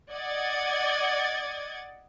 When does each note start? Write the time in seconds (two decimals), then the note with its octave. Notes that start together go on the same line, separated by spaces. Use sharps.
0.12 D5 D#5 F#5 G#6 A6